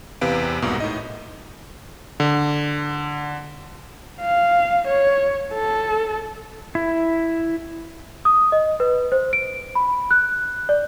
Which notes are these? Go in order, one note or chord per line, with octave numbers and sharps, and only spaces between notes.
E2 C3 B4 F5 D7
C2 G#2 B2 A#3
A2 D#4 D#5
D3
F5
C#5
A4
E4
D#6
D#5
B4
C5
D7
B5
F#6
D5